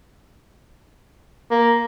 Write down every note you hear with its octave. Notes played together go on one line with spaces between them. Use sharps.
A#3